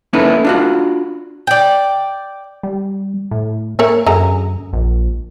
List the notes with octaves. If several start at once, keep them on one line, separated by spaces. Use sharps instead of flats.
A#3 C#4 D#4 E4 A4 B4
D4 F4 F#4
D5 G5
G3
A2
A#3 A#4 C#5 E5
F#2 D3 G#4 A#5
A#1